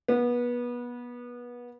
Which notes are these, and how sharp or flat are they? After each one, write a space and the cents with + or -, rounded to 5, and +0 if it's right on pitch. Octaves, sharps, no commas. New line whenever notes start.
B3 -25